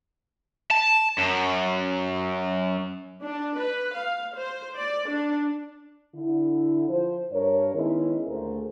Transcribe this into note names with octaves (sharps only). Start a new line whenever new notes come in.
A5
F#2
D4
B4
F5
C5
D5
D4
D3 E4
F3 C5
G2 D4 A#4 C#5
D#3 G#3 B3 C#4 E4
D2 A#2 A3 G#4 A#4 C5